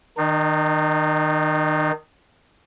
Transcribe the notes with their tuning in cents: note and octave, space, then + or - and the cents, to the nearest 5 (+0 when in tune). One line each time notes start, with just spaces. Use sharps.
D#3 +0 D#4 -45